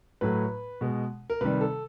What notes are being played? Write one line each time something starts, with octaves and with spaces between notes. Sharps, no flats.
A2 F#3 A3 B4
B2 G#3
A#4
C3 D#3 G3 B4
A4